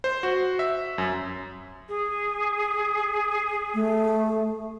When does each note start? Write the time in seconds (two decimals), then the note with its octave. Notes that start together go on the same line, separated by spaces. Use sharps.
0.04 C5
0.23 F#4
0.59 E5
0.98 F#2
1.89 G#4
3.75 A3